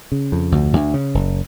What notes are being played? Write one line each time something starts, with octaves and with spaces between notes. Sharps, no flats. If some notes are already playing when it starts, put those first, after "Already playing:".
C#3
F2
D2
D2
C#3
F#1